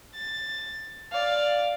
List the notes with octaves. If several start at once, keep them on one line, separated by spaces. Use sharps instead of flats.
A6
D5 F5